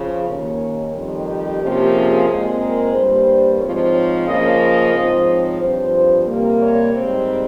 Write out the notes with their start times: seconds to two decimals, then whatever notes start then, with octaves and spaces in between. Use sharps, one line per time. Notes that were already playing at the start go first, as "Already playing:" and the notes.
Already playing: C#3 F3 C#5
0.27 D#2 D#3 A#3 C#4
0.94 F2 D#3 G3
1.27 G4
1.61 C3 F3 A#3 C#4
1.93 G#4
2.27 A#2 G#3 C4
2.60 A#4
2.93 G2 G3 A#3 C5
3.60 G#2 F3 C4 C#5
3.93 C#5
4.27 C#3 F3 A#3 C#4 D#5
4.93 G#2 F3 C4
5.27 C#5
5.60 G2 F3 C4 C5
6.27 C3 G3 A#3
6.60 C#5
6.93 G#2 G3 C4